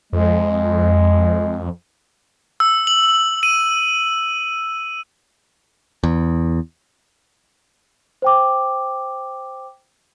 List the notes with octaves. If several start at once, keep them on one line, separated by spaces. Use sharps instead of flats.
F2 G#3
E6
F#7
D#7
E2
C5 G5 D6